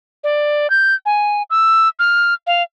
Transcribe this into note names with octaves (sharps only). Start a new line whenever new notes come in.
D5
G6
G#5
E6
F6
F5